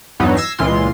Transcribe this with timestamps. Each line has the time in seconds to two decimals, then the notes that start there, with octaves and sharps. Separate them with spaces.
0.20 E2 G2 E3 F#3 B3 D#4
0.36 E6 G#6 A#6 C7
0.58 C#2 A#2 E3 G#3 F4 C6